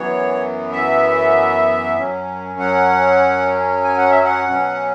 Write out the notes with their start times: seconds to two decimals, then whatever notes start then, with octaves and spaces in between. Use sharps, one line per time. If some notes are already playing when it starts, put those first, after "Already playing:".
Already playing: F#2 E3 B3 C#5
0.72 E5
1.98 F#2 F#3 C#4
2.59 F#5
3.84 G#5
3.97 F#5
4.10 E5
4.24 F#5
4.47 B2 F#3 C#4